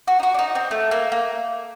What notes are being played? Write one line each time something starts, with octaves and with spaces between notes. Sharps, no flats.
F#4
D#4
F#4
D4
D#4
C4
A3
A#3
A#3